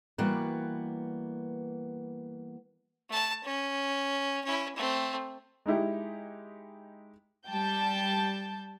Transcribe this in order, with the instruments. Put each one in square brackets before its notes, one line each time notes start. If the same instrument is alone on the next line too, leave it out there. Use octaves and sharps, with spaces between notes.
[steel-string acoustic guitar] E3 G3 A#3 B3 F#4 B4
[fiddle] A3 A5
C#4
C#4 E4
A3 C4
[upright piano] G#3 D#4 E4 G4
[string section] G3 G5 A5 G6